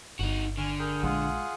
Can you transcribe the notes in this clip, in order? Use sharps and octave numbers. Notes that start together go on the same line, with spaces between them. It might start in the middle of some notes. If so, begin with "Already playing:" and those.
G1 D#4 F#4
D3 G#5 C#6 F6
G#4 A#4 G5
A#1 G#3 F4 G#4 F#5